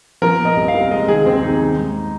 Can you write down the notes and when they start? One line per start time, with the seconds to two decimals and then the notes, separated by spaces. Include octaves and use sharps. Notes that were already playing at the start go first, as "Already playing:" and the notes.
0.22 F3 A#4
0.39 A#2
0.45 D#5
0.56 C2
0.68 F5
0.74 C2
0.91 G#3 D#5
1.08 D#3 G#4
1.26 D#2 C4
1.43 D#2 D#4
1.61 D#3
1.78 G#2